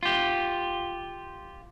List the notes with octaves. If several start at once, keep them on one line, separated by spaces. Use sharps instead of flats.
F4 G4